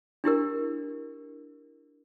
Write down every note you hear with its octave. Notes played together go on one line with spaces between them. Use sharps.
D4 E4 G4 A#4